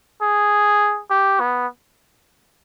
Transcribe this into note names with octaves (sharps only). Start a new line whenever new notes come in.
G#4
G4
B3